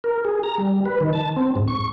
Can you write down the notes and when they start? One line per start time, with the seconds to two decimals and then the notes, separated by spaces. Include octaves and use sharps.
0.04 A#4
0.25 G#4
0.43 A#5
0.58 G3
0.86 B4
1.00 D#3
1.13 A5
1.36 C4
1.56 G#2
1.68 C#6